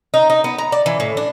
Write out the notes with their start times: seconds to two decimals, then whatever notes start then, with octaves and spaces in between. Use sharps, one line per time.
0.14 D#4
0.30 D#4
0.44 B3
0.58 A#5
0.72 D5
0.86 E3
1.00 A2
1.17 D4